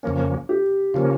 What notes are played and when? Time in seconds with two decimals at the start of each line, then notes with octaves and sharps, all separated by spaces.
0.03 F2 C#3 F3 A#3 C#4
0.49 G4
0.94 C#3 F3 A#3 C#4 F4